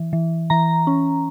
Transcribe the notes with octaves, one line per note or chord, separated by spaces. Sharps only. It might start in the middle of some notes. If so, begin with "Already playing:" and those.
Already playing: E3
E3
E3 A#5
C#4